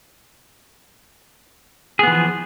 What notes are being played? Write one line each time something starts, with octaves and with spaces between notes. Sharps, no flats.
E3 F3 B3 G#4